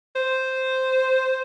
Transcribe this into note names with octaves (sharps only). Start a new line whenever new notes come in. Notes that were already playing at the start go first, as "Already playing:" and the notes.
C5